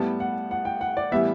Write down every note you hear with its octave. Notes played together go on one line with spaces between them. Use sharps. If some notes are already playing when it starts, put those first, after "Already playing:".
Already playing: A2 G3 B3 A5
F#5
F#5
G5
F#5
D5
A2 E3 G3 B3 E5